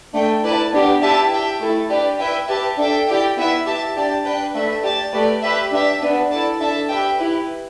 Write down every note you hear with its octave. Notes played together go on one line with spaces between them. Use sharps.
A3 D4 A4 G5
E4 B4 D5 A5
B3 D4 G4
E4 G4 B4 E5 A5
G4 E5 G5
A3 E4 A4
D4 G4 B4 D5
E4 B4 E5 G5
G4 B4 E5 A5
D4 A4 E5 G5
E4 G4 D5 G5
B3 E4 B4 E5
G4 E5 A5
D4 G4 D5 A5
D4 B4 G5
A3 D4 B4 E5
G4 D5 A5
A3 G4 B4 D5
G4 B4 E5
D4 G4 E5
B3 D4 B4
E4 A4 D5 A5
D4 A4 E5 A5
G4 B4 E5 G5
E4 G4 B4